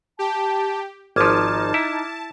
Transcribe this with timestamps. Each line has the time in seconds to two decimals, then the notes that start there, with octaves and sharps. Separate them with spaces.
0.19 G4 A5
1.16 G#1 F3 D#4 A5 D6 F6 G#6
1.74 E4